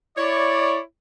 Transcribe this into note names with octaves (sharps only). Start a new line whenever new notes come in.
E4 C#5 D5